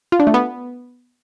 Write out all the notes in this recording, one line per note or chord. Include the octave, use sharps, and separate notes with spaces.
F4
D4
A3
B3